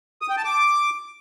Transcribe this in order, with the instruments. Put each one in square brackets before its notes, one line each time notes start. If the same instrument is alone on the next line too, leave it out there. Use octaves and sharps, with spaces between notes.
[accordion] D#6
G5
A5
D6